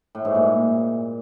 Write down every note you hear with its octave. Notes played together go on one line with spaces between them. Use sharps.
A2
G#2
A#2